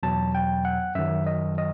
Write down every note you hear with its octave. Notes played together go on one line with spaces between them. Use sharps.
E2 B2 F#3 A5
G5
F#5
F#2 D#3 F#3 E5
D#5
D#5